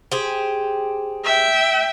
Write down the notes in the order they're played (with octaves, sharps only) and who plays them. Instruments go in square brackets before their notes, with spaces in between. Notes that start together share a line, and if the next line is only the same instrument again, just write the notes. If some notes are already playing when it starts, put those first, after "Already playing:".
[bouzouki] G4 G#4 C5
[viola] E5 G5